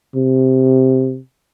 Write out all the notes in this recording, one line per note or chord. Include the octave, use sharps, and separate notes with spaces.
C3